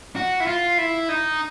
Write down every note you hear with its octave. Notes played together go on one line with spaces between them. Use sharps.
F#4
E4
F4
E4
D#4